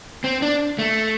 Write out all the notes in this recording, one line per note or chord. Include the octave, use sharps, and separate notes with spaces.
C4
D4
A3